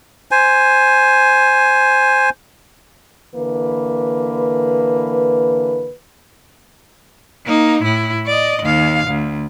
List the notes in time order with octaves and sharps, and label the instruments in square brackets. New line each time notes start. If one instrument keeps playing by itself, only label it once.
[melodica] C5 G#5
[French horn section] D3 E3 A#3 B4
[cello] A#3 D#4
A2 E4
D5 D#5
D#2 F5
D2